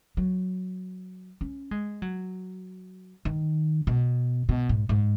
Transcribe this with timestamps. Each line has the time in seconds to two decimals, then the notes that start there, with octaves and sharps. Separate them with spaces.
0.17 F#3
1.41 C#4
1.71 G#3
2.02 F#3
3.25 D#3
3.87 B2
4.49 B2
4.69 G#2
4.89 G#2